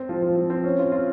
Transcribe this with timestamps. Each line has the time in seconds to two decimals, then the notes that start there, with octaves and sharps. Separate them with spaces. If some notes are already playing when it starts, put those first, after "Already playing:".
Already playing: C4
0.09 F3
0.22 F3
0.36 F3
0.50 C4
0.64 C#4
0.79 F4
0.92 F4